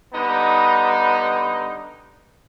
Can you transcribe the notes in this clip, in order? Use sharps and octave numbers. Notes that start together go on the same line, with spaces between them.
D3 G3 B3 D#4